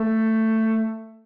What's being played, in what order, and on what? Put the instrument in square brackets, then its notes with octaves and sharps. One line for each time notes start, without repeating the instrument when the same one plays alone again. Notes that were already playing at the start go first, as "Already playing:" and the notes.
Already playing: [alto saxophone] A3